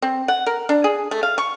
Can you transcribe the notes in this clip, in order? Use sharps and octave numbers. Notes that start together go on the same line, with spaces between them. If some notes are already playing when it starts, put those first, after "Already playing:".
C4
F#5
A#4
D4
G#4
A3
F5
C#6